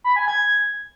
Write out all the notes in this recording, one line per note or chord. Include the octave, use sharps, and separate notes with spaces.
B5
G#5
G#6